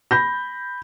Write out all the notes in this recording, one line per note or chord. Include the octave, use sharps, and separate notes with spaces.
B5 G6 A#6